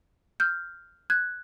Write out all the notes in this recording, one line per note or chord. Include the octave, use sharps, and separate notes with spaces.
F6 G6
F#6 G#6